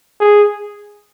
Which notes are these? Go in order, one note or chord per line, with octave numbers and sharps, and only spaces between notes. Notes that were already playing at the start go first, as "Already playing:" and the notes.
G#4